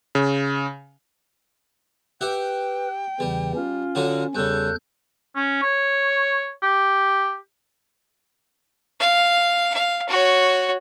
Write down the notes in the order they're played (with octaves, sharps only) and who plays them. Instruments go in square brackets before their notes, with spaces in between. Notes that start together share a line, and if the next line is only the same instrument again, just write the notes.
[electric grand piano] C#3
[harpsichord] G4 E5 F#5 [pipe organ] B4 [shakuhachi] G5
[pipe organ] E2 C#3 E3 [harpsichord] G3
[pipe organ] C#4 [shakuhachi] F4
[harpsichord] D3 F#3 F#4
[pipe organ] E2 F#6 G6 [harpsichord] G2 C#3 [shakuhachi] A4
[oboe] C#4
C#5
G4
[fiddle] F5
F5
F#4 C#5